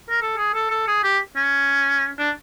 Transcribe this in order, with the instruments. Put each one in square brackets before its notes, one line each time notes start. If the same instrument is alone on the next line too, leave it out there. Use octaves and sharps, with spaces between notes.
[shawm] A#4
A4
G#4
A4
A4
G#4
G4
C#4
D4